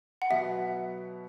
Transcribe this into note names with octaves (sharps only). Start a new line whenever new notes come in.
F#5
B2 F#3 B3 E5